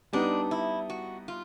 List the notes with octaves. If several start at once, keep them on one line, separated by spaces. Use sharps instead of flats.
G3 B3 D4 D#4
E4
F#4
F4